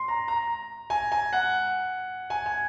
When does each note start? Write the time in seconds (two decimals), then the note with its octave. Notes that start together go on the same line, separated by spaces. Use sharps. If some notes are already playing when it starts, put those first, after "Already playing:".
Already playing: C6
0.08 A#5
0.28 A#5
0.90 G#5
1.12 G#5
1.33 F#5
2.30 G#5
2.46 G#5